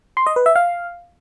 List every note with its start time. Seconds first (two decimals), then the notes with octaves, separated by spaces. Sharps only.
0.17 C6
0.27 D#5
0.36 B4
0.46 E5
0.56 F5